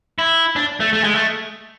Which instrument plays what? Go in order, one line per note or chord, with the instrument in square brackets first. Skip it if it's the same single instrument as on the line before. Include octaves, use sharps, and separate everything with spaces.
[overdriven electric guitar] E4
D4
A3
A3
G#3
A3